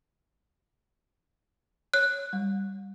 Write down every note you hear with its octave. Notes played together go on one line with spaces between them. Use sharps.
C#5 F#6
G3